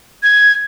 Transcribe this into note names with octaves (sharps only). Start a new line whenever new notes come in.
G#6